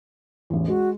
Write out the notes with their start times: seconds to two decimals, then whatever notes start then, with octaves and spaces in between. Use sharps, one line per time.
0.50 A1 E2
0.68 G#3 F#4